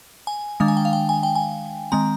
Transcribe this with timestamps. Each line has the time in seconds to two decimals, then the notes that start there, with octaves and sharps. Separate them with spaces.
0.27 G#5
0.60 D#3 G#3 D4 F5
0.68 G#5
0.77 G5
0.85 F5
0.93 G5
1.09 G#5
1.23 G5
1.35 G#5
1.92 D#3 G#3 C4 A#5